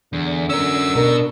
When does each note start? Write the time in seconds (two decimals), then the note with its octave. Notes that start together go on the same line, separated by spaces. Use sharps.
0.13 E2 D3
0.49 C#4 A#4 E6
0.95 B2 D4 A#4